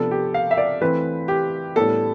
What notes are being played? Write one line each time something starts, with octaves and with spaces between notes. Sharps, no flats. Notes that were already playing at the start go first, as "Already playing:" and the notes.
Already playing: C3 F3 B3 D4 A4
G4
F5
E5
D5
E3 A3 C4 B4
G4
A2 G3 B3 D4 A4